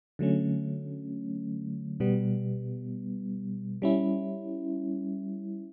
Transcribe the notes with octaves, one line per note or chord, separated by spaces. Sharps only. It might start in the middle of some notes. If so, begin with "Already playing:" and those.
D3 F#3 A3 C#4
B2 G3 B3
G3 C#4 E4